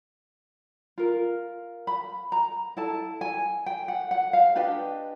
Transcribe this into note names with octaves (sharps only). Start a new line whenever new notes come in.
F4 A#4
B5
A#5
E4 A4 A5
G#5
G5
F#5
F#5
F5
D4 G4 B4 D#5